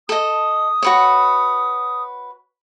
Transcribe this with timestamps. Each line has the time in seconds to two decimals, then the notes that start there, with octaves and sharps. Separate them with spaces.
0.09 A4 D#5 D#6
0.82 F#4 B4 C#5